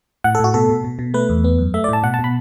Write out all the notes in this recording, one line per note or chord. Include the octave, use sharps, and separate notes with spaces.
A2 F#5
A4
A2 F#4
B2 A4
B2
B2
B2
A3 B4
E2
B3
F#2
A3 E5
D5
A2 A5
B2 F#5
A5
B2
B5